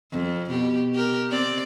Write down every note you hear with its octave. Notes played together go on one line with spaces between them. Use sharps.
F2
B2 G4
G4 A#4
C4 D5